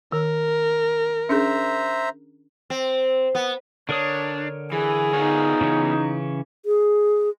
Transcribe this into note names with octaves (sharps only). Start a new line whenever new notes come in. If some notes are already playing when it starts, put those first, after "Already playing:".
D#3 A#4
C#4 D4 G#4 C5 E5 A#5
C4
B3
D3 D4 A#4 C#5 D#6
E3 G#4
B3 D#4 F4 C#5
C#3 E3 C#4
G#4